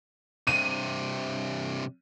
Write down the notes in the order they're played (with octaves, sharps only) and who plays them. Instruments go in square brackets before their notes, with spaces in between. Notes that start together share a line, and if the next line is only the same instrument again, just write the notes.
[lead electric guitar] G2 C3 [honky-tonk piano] D#7